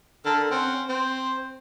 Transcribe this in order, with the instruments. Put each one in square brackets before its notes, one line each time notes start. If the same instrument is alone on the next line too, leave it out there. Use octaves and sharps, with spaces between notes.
[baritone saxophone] D3 [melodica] A4 A#4
[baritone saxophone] C4 [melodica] C#4 F#5
[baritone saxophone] C4 [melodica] C5